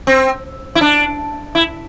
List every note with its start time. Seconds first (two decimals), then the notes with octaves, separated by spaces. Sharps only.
0.07 C4
0.75 E4
0.81 D4
1.55 E4